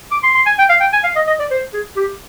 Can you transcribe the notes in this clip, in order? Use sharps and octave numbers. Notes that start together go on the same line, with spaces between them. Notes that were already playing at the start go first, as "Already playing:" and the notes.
D6
C6
C6
G#5
G5
F5
G5
G#5
F5
D#5
D#5
D5
C5
G#4
G4